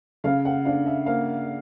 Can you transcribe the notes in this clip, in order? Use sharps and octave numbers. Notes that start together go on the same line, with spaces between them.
C#3 F5
F#5
D4 F5
E5
A#3 F5